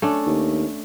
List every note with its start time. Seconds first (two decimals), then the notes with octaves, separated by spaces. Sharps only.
0.02 A3 C#4 D4
0.26 D#2